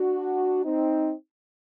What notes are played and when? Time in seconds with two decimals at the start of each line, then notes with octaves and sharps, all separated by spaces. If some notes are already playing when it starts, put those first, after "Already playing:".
Already playing: D4 F#4
0.65 C4 D#4